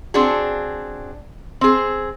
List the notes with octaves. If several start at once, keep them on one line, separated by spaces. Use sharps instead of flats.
C4 D4 F#4 G#4
C4 G#4